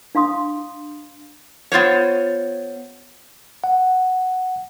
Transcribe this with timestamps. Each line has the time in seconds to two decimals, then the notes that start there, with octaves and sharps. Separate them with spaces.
0.15 D4 F5 C6 D#6
1.72 B3 F4 C5 C#5
3.64 F#5